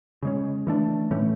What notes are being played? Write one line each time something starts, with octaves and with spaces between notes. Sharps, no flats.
C#3 G#3 C#4
E3 A3 D4
A2 E3 A3 C#4